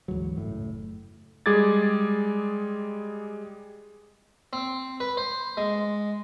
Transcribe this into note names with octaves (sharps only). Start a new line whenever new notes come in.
D2 G#2 E3 F#3
F#1 A2
G3 G#3 G#4 D6 G#6 A6
C4
B4
C5
G#3